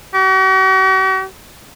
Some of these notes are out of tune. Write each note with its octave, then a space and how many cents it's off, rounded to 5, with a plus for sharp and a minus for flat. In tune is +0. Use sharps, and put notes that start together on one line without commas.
F#4 +45